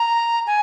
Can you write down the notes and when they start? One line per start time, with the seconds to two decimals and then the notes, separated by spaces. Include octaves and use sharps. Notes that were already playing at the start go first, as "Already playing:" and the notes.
Already playing: A#5
0.47 G#5